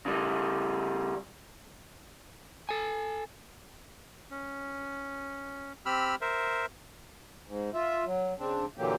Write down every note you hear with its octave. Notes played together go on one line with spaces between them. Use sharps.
C#3 G3
A4 G#5
C#4
C4 G4 B5 E6 F6
A#4 C5 E5
G#2
F4 E5
F#3
C#3 C4 D4
A#2 D3 E3 F#3 A#3 G4